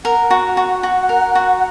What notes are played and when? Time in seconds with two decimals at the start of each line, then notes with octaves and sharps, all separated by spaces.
0.04 A#4 F#5
0.31 F#4
0.57 F#4
0.83 F#4
1.09 A#4
1.35 F#4